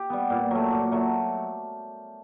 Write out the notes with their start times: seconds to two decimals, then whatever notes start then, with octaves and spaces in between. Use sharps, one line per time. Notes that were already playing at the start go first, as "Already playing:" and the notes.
Already playing: G4
0.10 G3 B3
0.30 A#2
0.51 F#3 A3
0.71 A#2
0.92 F#3 A3